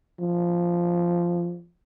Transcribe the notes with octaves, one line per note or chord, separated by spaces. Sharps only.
F3